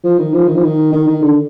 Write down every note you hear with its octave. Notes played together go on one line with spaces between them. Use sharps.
F3
D#3
F3
D#3
F3
D#3
D#3
D#3
D3